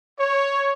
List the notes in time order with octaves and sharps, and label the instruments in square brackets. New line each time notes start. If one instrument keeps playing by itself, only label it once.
[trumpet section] C#5